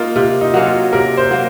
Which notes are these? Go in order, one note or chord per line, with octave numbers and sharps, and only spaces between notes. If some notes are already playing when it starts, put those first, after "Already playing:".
Already playing: A#3 D#4 F4
C3 F4
D#4
F#3 A#3 C#4
F4
C3 A#4
C5
F#3 A#3